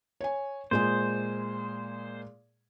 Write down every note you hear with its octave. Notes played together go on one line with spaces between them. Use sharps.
C#5 G#5
A#2 G#3 G#4 C5